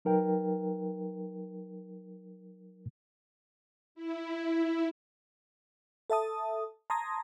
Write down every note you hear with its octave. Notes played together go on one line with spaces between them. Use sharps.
F#3 D#4 A#4 B4 G5
E4
A4 E5 A5 D#6
A5 A#5 C6 D#6 G#6 A#6